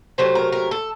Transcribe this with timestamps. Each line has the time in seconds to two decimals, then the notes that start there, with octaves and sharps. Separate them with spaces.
0.18 C3 F#3 A3 C5
0.35 A#4
0.52 A#4
0.71 A4